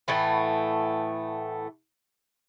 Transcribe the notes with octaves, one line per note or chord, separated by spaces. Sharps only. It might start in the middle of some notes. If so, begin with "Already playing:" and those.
A2 E3 A3 B3